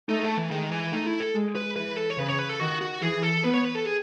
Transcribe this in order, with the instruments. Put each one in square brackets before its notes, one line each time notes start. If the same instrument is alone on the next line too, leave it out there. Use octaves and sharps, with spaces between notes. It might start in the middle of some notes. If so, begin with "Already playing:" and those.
[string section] A3 [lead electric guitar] D#4
[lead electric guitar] A3
E3
[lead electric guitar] D#3 [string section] G#3
[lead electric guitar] E3
[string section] A3 [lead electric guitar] D#4
[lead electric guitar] E4
A4
[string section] G#3
[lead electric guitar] B4
[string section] E3 [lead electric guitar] B4
[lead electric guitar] A4
C#5
[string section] C#3 [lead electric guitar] B4
[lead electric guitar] C#5
B4
A4
[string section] D#3 [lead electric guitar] F#4
[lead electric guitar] F#4
[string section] E3 [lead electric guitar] G#4
[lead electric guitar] A4
[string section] B3 [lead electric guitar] B4
[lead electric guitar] C#5
B4
A4
G#4